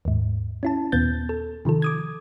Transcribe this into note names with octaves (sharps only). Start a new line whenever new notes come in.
D#2 G#2
C#4 E4 A5
D#2 A#2 B3 G6 A6
A4
C3 D#3 F3 A4
D6 D#6 G#6